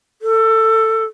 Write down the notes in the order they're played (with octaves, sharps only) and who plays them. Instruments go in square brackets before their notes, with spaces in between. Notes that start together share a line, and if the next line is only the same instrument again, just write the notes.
[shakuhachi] A4